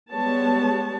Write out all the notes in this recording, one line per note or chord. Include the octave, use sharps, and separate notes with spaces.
G3 G#3 B3 C#5 A5